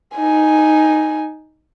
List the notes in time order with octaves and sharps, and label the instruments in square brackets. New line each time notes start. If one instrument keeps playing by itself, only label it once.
[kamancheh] D#4 G#5